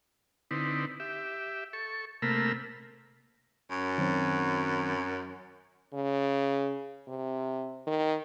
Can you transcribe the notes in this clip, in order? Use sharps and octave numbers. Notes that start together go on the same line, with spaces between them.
D3 C4 D#4 E4 B4
G4 E5
A4 C#6
C3 A3 A#3 A#4 B5 E6
F#2
D#3 F#3 C4
C#3
C3
D#3